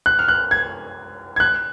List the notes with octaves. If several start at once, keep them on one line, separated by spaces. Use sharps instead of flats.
F#6
F6
F#6
G#6
G#6
F#6